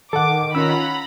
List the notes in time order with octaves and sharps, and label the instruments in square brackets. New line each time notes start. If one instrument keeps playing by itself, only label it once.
[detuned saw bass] D#3 [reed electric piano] A4 F#5 [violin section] D6
[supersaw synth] C#4 F4 F#5 [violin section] A#5 B5 [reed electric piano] E6